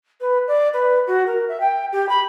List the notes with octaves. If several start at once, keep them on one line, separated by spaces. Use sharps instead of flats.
B4
D5
B4
F#4
A#4
E5
G5
G4
B5